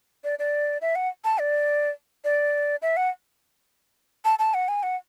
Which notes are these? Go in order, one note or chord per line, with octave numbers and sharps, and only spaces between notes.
D5
D5
E5
F#5
A5
D5
D5
E5
F#5
A5
A5
F#5
G#5
F#5